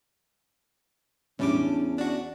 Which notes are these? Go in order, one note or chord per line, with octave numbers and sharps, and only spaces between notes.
E2 A2 G3 C#4 D4 D6
D4 F#4 D5